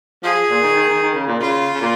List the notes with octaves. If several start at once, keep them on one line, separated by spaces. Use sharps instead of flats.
F3 G#4
A#2
D#3
D#3
D#3
D#3
C#3
A#2
C#3 F4
C#3
A#2